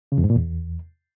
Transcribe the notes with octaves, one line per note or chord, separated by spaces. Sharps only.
C#3
F2
G#2
A#2
E2